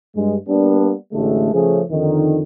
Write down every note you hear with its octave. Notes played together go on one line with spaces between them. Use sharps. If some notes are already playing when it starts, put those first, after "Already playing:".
G2 G#3
G3 A#3 B3 D4
A1 D3 G#3 A3
C#3 F3 A3 C#4 G#4
F2 D3 D#3